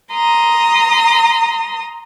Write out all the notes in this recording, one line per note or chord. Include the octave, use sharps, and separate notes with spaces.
A#5 C6 D#6